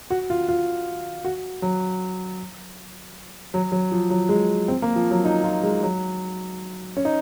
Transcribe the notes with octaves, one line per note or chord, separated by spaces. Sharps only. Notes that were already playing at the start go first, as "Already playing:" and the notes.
F#4
F4
F4
F#4
F#3
F#3
F#3
F3
F#3
G#3
C4
A#3
F3
F#3
D#4
F4
G#3
F#3
C#4
D#4